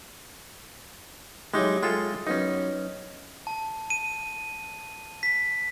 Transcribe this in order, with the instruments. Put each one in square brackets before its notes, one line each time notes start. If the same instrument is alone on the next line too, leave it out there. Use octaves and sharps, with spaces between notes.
[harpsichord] F#3 E4 G4 [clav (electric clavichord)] G#3 D#4
[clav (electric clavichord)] G#3 F4 A4 [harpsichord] E5 G5
[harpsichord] F#2 B3 [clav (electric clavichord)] C#4 D#4
[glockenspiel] A5
D#7
B6